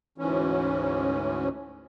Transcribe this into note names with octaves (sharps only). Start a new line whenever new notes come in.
D2 G#2 E3 C#4